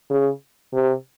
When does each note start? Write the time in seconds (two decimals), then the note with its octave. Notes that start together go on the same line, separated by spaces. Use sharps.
0.10 C#3
0.73 C3